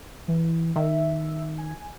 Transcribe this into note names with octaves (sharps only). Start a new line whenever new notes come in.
E3
D#3 E5
G#5